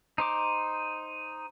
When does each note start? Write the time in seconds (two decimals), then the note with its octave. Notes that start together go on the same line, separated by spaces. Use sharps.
0.18 D#4 C5 D6